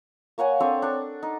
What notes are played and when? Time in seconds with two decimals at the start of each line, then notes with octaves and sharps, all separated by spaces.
0.38 A#3 C#5 F#5 G#5
0.60 C4 D4 A4 C#5
0.82 D4 C#6
1.23 D#4